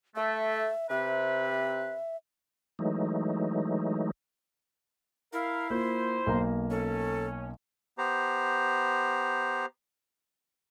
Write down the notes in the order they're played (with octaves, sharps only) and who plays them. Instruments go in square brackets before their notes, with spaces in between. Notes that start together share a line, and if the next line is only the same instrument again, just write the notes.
[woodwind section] A3 [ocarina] E5
[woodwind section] C3 B4 [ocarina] E5
[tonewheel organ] E3 F#3 G#3 A3 D#4
[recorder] E4 [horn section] A#4 F5
[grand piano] A#3 F4 [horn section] C5
[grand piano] B1 A#3 A#5
[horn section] C#4 [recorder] A4
[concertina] B3 G4 C5 A#5